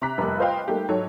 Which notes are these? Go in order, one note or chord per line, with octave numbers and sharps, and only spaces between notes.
C3 A#5 D6 F#6 B6
F1 G3 A#3 F#6
F4 B4 C5 D#5 F5 G5
G3 A3 A#3 D#4 G4
G#2 F#3 A4 C#5